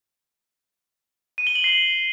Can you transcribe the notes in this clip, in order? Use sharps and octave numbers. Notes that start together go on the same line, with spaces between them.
D#7
G7
F#7
C7